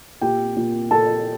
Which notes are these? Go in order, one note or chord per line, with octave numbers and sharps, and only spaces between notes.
A#2 G4 G5
A#2
A#2 A4 A5